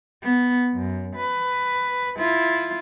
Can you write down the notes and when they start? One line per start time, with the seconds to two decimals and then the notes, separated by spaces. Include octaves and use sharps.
0.23 B3
0.74 F#2
1.16 B4
2.18 E4 F4